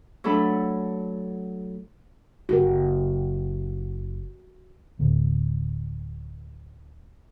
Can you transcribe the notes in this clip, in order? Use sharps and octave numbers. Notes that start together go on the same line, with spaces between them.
F#3 A3 D4 A4 B5
F#1 F#4 G4 A#4
D1 D2